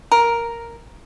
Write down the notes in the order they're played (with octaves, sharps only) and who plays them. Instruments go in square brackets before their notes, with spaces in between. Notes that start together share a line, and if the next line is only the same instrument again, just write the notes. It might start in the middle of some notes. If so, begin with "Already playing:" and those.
[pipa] A#4